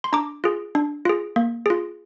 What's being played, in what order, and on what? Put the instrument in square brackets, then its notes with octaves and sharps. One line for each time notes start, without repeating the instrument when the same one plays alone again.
[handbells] C6
D4 A#5 D6
F4 G#4
D4
F4 G#4
A#3
F4 G#4